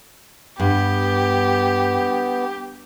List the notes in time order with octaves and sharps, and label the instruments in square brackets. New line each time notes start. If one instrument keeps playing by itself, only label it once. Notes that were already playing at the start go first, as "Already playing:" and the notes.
[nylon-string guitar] G2 [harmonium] B3 [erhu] G4